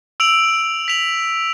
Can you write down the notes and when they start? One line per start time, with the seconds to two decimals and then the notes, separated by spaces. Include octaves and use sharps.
0.20 E6 D7 F7 F#7
0.88 B6 F7 F#7